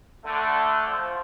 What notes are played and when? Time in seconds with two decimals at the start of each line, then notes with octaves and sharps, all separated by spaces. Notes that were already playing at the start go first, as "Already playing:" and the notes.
0.24 D3 A3
0.87 F3